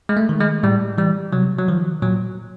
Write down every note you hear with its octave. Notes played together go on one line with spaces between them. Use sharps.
G#3
A3
D#3
G#3
A2 G3
E3 G3
C3 F#3
F#3
D#3 F3
A#2 F#3